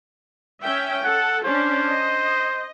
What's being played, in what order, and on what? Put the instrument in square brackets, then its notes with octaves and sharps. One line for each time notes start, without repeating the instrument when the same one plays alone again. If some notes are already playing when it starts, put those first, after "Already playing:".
[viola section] C#4 E5 G5
[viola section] A4 [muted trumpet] F#5
[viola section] C#4 D4 [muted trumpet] C5
[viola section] D#5